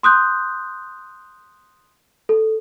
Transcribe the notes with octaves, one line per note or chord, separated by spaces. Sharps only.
C6 D#6 F#6 G6
A4